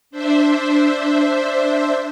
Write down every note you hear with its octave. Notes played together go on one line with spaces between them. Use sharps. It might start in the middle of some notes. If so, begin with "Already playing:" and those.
D4 C5 E5